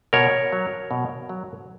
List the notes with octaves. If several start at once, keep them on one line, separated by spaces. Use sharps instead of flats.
B2 A#4 C#5
F#3
B2
F#3